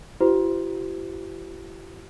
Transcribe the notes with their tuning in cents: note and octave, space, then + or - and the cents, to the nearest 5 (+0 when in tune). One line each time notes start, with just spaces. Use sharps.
E4 +40 G4 -40 C5 -30